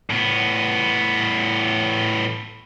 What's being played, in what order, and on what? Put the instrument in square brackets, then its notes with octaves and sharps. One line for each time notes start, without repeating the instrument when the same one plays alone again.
[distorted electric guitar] A2 B3